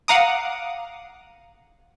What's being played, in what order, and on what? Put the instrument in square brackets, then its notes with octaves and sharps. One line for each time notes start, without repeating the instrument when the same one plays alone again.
[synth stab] F5 F#5 A#5 D6 D#6